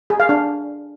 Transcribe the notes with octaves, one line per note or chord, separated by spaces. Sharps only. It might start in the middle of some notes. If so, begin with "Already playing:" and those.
G#4
F5
D4